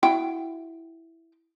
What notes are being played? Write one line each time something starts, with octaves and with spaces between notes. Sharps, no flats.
E4 F#4 G5